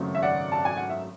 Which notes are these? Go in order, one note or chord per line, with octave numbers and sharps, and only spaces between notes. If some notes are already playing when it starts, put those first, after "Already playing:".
Already playing: G#1 F#2 C#3 F#3 A3
E5
D5 F#5
A5
G#5
F#5
E5